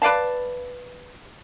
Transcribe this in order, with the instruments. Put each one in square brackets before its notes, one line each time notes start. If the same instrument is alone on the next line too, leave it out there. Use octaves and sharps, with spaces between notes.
[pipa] B4 D5 F5 A5